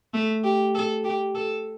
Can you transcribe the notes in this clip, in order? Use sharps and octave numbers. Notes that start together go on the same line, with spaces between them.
A3
G4
A4
G4
A4